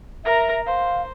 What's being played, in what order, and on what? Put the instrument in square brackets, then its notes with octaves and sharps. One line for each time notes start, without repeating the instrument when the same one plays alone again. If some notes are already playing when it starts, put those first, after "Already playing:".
[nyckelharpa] A#4 A#5 [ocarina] E5
[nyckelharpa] C5 [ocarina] F5